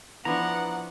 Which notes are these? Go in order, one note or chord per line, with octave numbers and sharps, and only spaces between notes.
E3 F3 B3 D4 F#5 A#5